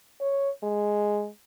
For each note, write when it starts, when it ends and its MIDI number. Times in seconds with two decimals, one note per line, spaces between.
0.21 0.50 73
0.63 1.28 56